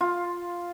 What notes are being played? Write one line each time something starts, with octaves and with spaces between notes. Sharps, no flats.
F4